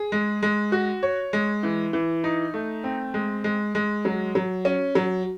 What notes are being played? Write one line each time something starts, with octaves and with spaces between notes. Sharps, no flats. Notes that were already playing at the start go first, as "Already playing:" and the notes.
Already playing: G#4
G#3
G#3
F#4
C#5
G#3
E3
E3
D#4
A3
C4
G#3
G#3
G#3
F#3
F#3
C#4
F#3